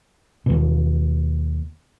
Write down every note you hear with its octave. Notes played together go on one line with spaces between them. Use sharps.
D#2 B2